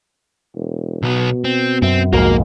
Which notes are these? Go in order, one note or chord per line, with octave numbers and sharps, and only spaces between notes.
E1
B1 B2 B3
C4
F#2 C4
B1 F2 G#2 A#3 F#4 A#4